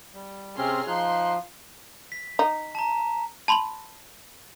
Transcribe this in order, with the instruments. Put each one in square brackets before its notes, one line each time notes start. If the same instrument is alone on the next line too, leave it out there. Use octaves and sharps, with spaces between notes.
[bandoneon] G3
[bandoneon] C3 C4 C#4 [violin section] G#4 C6 F6
[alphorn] F3 [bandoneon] D#4 F#6 [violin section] C6
[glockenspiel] B6
[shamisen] D#4
[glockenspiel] A5 A#5
[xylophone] A5 B5 C6 F7 F#7